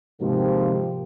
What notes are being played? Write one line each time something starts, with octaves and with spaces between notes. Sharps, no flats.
G#2 C3 D#3 F3 A#3 G4